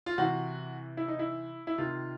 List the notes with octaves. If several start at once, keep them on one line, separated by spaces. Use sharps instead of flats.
F4
C3 E3 F#4
E4
D#4
E4
E4
C3 D#3 F4